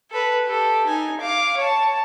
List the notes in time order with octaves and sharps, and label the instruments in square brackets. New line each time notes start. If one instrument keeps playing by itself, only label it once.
[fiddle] A4 B4
G4 A4
D#4 G#5
F5 D6
C#5 A5